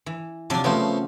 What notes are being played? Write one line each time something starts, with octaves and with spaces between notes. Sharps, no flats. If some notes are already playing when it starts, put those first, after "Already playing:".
E3
C3 F3 F#3 D4 A5
C#3 F3 A3 B3 C5